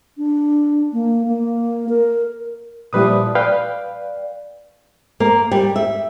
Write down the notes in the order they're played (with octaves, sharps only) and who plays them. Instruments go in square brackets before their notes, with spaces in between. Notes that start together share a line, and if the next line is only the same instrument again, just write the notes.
[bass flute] D4
A#3
A#3
A#4
[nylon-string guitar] A#2 F3 E4 [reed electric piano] G3 B4 D#6
[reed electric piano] B4 F5 G5 [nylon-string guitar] D5
[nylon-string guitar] A#3
G3
E5